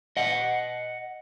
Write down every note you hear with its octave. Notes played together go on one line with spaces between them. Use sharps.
D#5 F#5